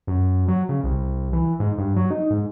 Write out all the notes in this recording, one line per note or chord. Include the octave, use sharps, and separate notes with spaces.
F#2
F#3
C#3
C2
E3
G#2
G2
F#3
D#4
G#2